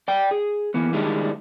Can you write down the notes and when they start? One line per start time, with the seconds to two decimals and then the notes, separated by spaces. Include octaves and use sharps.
0.08 D5 G5
0.31 G#4
0.74 E3 A#3 B3
0.93 D#3 G3 G#3 D4 E4